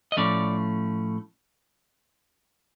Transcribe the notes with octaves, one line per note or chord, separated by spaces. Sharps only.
D#5
A2 F3 A3 C#4 D5